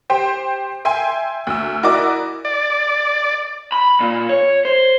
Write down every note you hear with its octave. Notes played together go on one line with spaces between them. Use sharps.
G4 C5 G5
E5 G5 G#5 C6
D2 E6
E4 F#4 A#4 D5 D#5 D6
D5
B5
A#2
C#5
C5